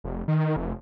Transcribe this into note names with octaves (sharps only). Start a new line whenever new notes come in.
F1
D#3
F1